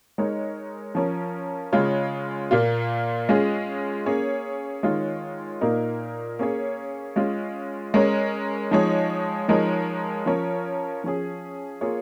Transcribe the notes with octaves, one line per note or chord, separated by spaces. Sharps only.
G#3 D#4 A#4 C#5
F3 C#4 A#4
C#3 G#3 F4 C#5
A#2 A#3 F4
G#3 C#4 F4 G#4
A#3 C#4 G#4 C#5
D#3 G#3 F4 C#5
A#2 A#3 D#4 A#4
A#3 C#4 G#4 C#5
G#3 C#4 F4
G#3 C#4 A#4 C#5
F3 G#3 D#4 C#5
F3 G#3 D#4 A#4 C#5
F3 C#4 A#4 C#5
F3 C#4 G#4
A#3 F4 G#4 C#5